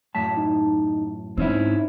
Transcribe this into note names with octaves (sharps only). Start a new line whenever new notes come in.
F#2 A2 A5 B6
D#4
G#2 C4 C#4 D#4 E4